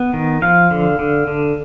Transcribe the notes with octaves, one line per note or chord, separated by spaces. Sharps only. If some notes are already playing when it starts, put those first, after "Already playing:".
Already playing: B3
D#3
F3 F5
D3
D3
D3